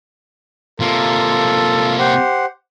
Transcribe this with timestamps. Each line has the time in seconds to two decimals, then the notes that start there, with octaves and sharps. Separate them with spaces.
0.80 C3 A#3 F4 A4
1.99 G4 C5 F#5